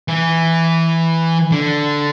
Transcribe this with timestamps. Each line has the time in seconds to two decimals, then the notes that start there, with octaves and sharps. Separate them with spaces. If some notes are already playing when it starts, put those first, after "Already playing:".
0.08 E3
1.52 D3